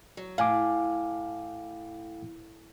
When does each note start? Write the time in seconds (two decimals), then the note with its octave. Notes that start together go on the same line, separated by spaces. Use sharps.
0.17 F#3
0.38 A2 F5 G#5 D6